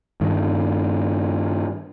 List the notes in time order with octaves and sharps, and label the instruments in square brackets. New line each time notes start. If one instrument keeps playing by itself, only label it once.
[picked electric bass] G2 D#3